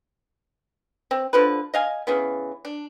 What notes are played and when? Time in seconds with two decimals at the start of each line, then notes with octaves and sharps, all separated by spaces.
1.11 C4
1.33 D3 F3 B4
1.74 D#5 F5 G#5
2.07 C#3 E3 B3
2.65 D4